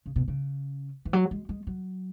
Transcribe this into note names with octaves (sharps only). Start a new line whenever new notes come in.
C#3
B2
C#3
E3
F#3
G#3
G#3
F#3